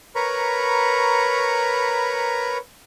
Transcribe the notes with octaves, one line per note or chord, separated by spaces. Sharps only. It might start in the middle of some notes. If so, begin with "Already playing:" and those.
A#4 B4 C#5 A#5 B5 C#6